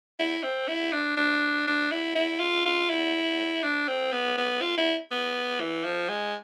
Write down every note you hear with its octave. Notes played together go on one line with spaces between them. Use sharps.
E4
C4
E4
D4
D4
D4
E4
E4
F4
F4
E4
D4
C4
B3
B3
F4
E4
B3
E3
F3
G#3